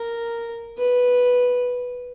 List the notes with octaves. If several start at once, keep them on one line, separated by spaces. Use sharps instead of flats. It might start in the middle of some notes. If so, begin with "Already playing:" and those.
Already playing: A#4
B4